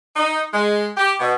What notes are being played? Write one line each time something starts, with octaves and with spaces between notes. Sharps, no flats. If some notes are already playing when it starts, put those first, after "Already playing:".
D#4
G#3
G4
B2